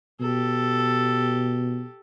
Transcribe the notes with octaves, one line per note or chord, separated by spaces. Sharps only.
B2 G4 A4